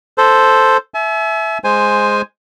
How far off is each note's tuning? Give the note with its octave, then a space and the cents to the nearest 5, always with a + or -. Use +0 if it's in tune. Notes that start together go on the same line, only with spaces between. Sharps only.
A4 +0 C5 +0
E5 +0 G#5 +45
G#3 +0 C5 +0 G#5 +0